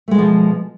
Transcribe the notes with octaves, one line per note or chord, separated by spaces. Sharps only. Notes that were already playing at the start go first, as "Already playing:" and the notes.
B2 F3 G#3 A3